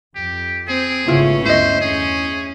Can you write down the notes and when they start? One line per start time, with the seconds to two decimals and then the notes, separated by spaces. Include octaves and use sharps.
0.15 F2 G4
0.68 C4 G#4
1.08 G#1 C#3 A3 B3 C#4 E4 F4
1.45 D2 G2 E4 C5 D#5
1.81 E2 C#4 G#4